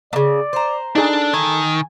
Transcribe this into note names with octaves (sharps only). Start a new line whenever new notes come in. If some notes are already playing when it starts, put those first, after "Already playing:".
A#2 C#3 D5
C5 A#5
D4 D#4 G#4 A4
D#3 G#5